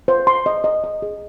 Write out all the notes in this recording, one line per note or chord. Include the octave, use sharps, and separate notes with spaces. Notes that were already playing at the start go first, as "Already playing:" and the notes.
C5
C6
D#5
D#5
D#5
G#4